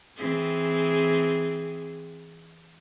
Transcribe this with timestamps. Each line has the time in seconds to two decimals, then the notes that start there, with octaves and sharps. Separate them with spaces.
0.16 E3 C4 G#4